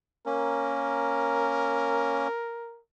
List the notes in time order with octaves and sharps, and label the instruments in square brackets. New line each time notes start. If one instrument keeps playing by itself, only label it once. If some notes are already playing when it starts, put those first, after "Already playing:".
[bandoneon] A#3 C#4 [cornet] A#4